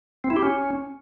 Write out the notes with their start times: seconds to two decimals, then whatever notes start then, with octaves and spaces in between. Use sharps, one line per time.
0.24 C4
0.30 E4
0.36 G4
0.42 C#4